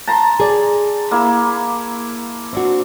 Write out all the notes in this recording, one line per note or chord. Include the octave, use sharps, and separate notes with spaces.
A5 A#5 C6
G#4 D5
A#3 E4
C4 D4 F#4